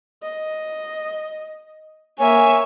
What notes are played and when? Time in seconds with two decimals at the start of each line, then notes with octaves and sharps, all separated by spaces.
0.22 D#5
2.19 A#3 C#5 E5 G#5